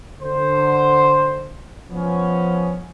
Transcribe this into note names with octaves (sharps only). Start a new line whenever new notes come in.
D3 C5
F3 B3 C#4